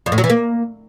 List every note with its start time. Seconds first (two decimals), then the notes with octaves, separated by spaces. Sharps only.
0.06 F2
0.12 A2
0.18 F#3
0.24 E3
0.30 A#3